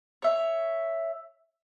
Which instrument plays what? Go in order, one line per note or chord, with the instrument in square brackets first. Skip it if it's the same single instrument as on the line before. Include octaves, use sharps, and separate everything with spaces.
[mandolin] C#5 E5